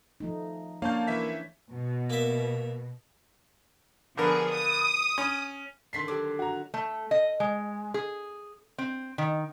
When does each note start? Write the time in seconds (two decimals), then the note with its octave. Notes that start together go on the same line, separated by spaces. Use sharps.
0.20 F3 A3 D#4
0.82 A#3 C#4 D4 C#5 F5 A5 G6
1.07 E3 E5 B6
1.72 B2
2.10 A#3 E5
4.17 D3 F3 B3 G#4 A#4
4.51 D#6
5.18 C#4
5.93 D3 D#3 D4 C6 B6 C7
6.08 F#3 G4 A4 D6
6.39 F#4 A#5
6.74 A3
7.11 D#5
7.40 G#3
7.94 G#4
8.78 C4
9.18 D#3